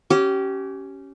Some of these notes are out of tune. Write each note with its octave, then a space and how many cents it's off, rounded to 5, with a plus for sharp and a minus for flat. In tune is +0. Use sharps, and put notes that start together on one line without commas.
C#4 +0 G4 -25